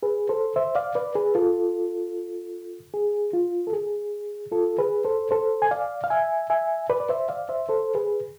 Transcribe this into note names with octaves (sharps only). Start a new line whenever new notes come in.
G#4 B4
A4 C5
C5 E5
D5 F5
B4 D5
G#4 B4
F4 A4
G#4
F4
A4
G#4
F4 A4
G#4 B4
A4 C5
A4 C5
G#5
D5 F5
F5
E5 G#5
E5 G#5
B4 D5
D5
C5 E5
D5 F5
C5 E5
A4 C5
G#4 B4